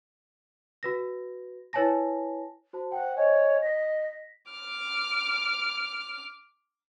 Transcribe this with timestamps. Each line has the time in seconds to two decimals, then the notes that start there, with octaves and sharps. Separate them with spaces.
0.83 F#4 B4 A#6
1.73 E4 B4 C#5 G#5 A5 A#6
2.73 F#4 C5 A5
2.92 C5 F#5 G5
3.16 C5 C#5 D#5 G#5
3.62 D#5 A#6 B6
4.52 D6 F6